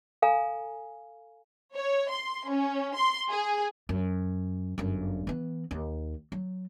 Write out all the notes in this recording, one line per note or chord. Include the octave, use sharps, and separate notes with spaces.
A4 F5 G#5 A#5
C#5
C6
C#4
C6
G#4
F#2
G1 F#2
E3 B3
D#2 D#4
F#3